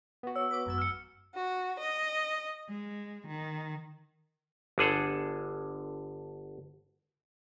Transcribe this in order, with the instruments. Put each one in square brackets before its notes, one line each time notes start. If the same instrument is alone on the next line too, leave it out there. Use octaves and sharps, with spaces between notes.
[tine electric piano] B3 F#4
[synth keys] C#5 [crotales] E6
[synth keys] B4 D6
G#1 F#2 E6
[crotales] F6 C#7
[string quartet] F#4
D#5
G#3
D#3
[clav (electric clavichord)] G1 D3 G#4 A4